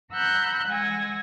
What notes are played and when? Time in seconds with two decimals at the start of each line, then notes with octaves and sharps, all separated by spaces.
0.12 F#5 A#5 B5 E6 F#6 G6
0.68 G#3 F#5 G#5 E6 G#6 A#6